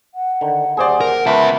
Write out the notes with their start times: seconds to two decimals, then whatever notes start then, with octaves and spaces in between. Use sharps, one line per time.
0.15 F#5
0.41 D3 D#3
0.77 D#1 G#4 C5 D5
1.01 A#4
1.27 C#2 B3 A#4 B4 E5 A5